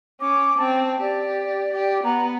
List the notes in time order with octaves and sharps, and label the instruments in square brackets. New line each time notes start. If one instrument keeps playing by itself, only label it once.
[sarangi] C#4 [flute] D6
[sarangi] C4 [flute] A5
[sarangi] G4 [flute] D5
[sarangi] G4
[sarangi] B3 [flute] A#5